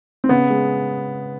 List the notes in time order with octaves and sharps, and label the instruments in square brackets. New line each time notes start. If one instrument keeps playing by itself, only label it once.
[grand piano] C4
C#3 B3
G#3